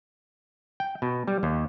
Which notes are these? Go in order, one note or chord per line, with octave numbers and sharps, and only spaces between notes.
G5
B2
G3
D#2